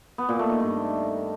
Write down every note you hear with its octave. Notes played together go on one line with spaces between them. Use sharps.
B3
A#2
A3
D#3
G2